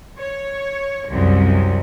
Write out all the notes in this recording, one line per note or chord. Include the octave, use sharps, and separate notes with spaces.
C#5
C2 F#2